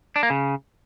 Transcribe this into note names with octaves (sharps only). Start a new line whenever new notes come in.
D4
A#3
C#3